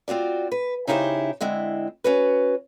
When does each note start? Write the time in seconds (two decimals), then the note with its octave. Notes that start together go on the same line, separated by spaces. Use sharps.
0.08 C4 F4 F#4 D5
0.52 B4
0.87 C#3 D#4 E4 G4 A#4 C5
1.41 D3 G#3 C4 E4
2.04 C#4 F#4 B4